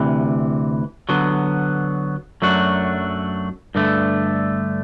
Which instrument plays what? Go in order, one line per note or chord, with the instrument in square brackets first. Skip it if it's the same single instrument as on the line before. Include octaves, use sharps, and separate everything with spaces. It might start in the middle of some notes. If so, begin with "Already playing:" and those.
Already playing: [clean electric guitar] D2 C3 E3
D3 F#3 B3
F#2 F#3 A3 D4 F#4
G2 D3 A3